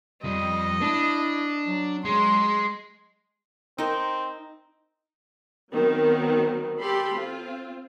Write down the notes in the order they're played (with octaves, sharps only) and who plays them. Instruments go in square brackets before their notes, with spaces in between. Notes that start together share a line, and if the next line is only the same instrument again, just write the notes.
[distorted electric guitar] F2 [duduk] G3 [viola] D#5
[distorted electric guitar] D4 [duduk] E4
[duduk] F#3
[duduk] F#3 [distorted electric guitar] G#3 [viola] C6
[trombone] C4 [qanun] D#4 A#4
[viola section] D#3 F#3 B3 C4
G3 G4 A4 B5 C6
C4 F4